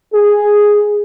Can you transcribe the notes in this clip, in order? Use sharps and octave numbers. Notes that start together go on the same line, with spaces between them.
G#4